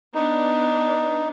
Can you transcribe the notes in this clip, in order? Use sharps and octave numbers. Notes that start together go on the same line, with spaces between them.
B3 D4 D#4